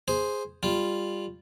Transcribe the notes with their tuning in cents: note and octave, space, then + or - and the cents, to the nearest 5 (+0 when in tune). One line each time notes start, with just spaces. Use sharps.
G#4 +0 C5 +0
G3 +15 F4 +0